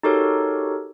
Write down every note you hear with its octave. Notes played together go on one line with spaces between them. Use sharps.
D#4 F#4 G4 A4 A#4 C#5